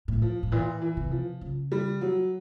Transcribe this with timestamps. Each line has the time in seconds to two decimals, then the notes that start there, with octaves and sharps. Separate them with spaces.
0.08 A2
0.22 F3
0.43 A2
0.52 A#2 E3
0.82 E3
0.97 C3
1.11 F3
1.41 C#3
1.72 G3
2.01 F#3